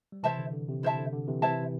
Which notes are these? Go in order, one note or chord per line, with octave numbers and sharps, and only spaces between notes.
G3
C3 E3 E4 C5 E5 A5
D3
D3
C3
E4 C5 E5 A5
D3
D3
C3 E3
C3 E3 E4 C5 E5 A5